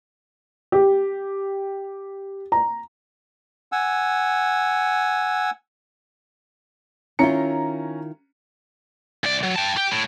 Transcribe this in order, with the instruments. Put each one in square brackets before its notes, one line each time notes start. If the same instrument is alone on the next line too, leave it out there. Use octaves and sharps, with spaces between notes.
[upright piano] G4
A#5
[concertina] F#5 G#5 E6
[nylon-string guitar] D#3 E4 F4 [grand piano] C#4 A#5 C#7
[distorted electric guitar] C2 D5
F#3
G5 A5
G4
A2